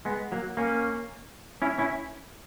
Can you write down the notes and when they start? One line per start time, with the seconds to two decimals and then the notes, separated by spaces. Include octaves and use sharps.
0.05 G#3 B3
0.32 F#3 A#3
0.57 A#3 C#4
1.62 C#4 E4
1.78 C#4 E4